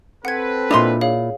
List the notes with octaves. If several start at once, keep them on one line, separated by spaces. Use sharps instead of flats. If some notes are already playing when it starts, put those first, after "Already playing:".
C4 A4 B4 F#5 G#6
A#2 D4 E4 D#5 C6 F7
G#4 C#5 F5